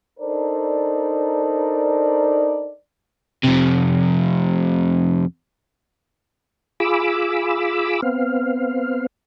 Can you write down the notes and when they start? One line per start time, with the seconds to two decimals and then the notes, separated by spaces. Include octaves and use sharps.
0.20 D4 D#4 A4 A#4 C5 D5
3.43 F2 C3
6.80 F4 G#4 B5 D6 E6
8.02 B3 C4 F5